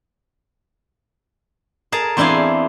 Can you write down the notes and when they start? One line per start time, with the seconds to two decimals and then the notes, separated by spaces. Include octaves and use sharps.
1.92 G#4 A#4 A5 A#5
2.17 E2 C4 D4 E4 F5 G#5